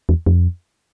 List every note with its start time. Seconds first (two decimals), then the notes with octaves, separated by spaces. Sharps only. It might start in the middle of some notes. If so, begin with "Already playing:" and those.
0.09 E2
0.26 F2